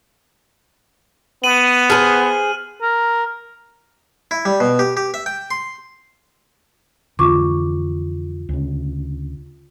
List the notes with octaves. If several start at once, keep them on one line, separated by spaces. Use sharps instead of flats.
B3 D#7 F#7
G#4 A4 C5 F6
A#4
E4
G3
B2
G4
G4
E5
G5
C6
F2 D3 E3 F4 C#6 D6
D2 C#3